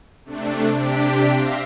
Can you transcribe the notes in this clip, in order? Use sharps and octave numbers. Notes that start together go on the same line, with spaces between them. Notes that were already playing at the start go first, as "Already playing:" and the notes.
C3 A3 D4
C3 D4 G4 B6 D7
E5 F5 C6 A#6